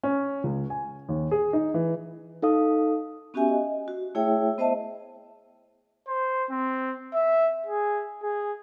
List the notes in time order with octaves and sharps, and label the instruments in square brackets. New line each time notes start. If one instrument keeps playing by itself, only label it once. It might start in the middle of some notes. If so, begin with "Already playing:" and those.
[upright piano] C#4
C#2
G#5
D#2
G#4
D#4
E3
[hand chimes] D#4 A4 F5 D#6
[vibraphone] B3 C#4 F#4 G4 E5 G#5
D#5
F#4
A3 E4 G#4 C#5 E5 G5
B3 C5 D#5 E5 A5
[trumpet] C5
C4
E5
G#4
G#4